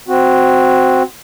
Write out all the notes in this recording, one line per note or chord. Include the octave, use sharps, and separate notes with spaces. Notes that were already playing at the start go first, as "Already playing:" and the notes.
C4 F#4